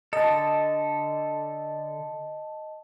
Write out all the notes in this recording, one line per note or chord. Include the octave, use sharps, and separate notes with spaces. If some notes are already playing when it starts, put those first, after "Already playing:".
D3 A4 D#5 A5